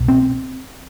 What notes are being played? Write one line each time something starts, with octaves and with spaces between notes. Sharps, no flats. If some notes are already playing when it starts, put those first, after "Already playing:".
Already playing: C2 B2
C4